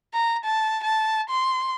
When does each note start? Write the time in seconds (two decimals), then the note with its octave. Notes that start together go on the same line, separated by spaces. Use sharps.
0.14 A#5
0.45 A5
0.84 A5
1.30 C6